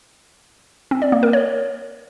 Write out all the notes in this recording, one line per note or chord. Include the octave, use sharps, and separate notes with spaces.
C4
D5
A#3
A#4
C#5